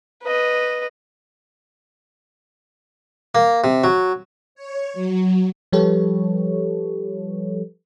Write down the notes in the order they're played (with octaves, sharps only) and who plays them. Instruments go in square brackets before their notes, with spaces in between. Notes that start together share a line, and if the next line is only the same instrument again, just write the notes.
[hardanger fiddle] B4 D#5
[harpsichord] A#3
C3
F#3
[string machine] C#5
F#3
[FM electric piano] F3 G3 G4 A4 B4 C#5